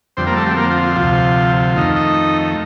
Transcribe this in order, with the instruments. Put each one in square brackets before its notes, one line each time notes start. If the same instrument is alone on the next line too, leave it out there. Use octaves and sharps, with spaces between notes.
[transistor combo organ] F2 D3 G3 C4 C5
A#3 A#4
A3 A4
G3 G4
A#3 A#4
F4
F4
D2 C3 F3 F4
F2 D#3 A3 D#4 F4
D#4 D#5